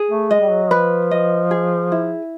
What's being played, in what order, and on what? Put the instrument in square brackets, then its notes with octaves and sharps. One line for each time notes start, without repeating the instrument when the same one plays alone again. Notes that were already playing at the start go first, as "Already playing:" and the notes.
Already playing: [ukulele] G#4
[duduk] A3
[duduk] G#3 [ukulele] D#5
[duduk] G3
F#3
[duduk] F3 [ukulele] B4
[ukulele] D#5
G#4
E4